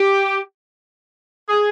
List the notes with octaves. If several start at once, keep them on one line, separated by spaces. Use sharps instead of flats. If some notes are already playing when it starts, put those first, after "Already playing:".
Already playing: G4
G#4